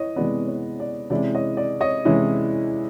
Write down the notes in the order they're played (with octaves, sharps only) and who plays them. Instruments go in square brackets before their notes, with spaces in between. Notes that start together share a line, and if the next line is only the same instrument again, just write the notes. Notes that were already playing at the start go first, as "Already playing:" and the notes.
Already playing: [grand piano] E3 C#5 D#5
C3 E3 G#3 B3 D5
C#5
D5
C3 E3 G#3 C#4 E4 D5
C#5 D#5
D5
C#5 D#5
C3 E3 G#3 C#4 E4